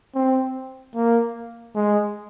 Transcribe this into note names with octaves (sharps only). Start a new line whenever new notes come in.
C4
A#3
G#3